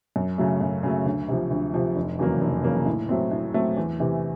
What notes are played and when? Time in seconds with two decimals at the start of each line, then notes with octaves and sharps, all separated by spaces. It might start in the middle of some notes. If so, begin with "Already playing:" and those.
0.16 F#2
0.38 C#3 F#3 A3
0.61 F#2
0.83 C#3 F#3 A3
1.05 D2
1.28 C3 F3
1.51 D2
1.74 C3 F3
1.96 F1
2.19 E2 C#3 F#3 A#3
2.41 F1
2.64 E2 C#3 F#3 A#3
2.86 A2
3.09 F#3 A3 C4
3.31 A2
3.54 F#3 A3 C4
3.77 E2
4.00 C3 E3